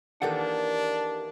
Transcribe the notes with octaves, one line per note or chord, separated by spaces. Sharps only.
D#3 E3 A#3 D4 G4 A4 F#5